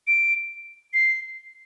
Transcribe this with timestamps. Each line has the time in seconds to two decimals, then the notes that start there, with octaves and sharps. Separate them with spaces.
0.07 D7
0.94 C7